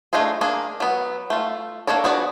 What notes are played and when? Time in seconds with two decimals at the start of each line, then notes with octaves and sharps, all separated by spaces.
0.13 A3 D4 D#4 F4 G#4
0.41 A#3 D4 G#4
0.80 F#3 B3
1.30 A3 F4
1.87 A#3 D4 A4 C#5 D5
2.04 B3 D4 F#4 G#4 D5